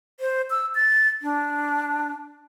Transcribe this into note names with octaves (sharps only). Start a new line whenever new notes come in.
C5
E6
A6
D4